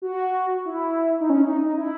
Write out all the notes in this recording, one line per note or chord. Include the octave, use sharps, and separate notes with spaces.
F#4
E4
D#4
C#4
D#4
D#4
E4